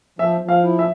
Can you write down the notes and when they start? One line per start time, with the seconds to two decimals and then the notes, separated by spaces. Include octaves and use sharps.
0.19 F3 E5
0.41 F3
0.49 F5
0.64 E4
0.79 E5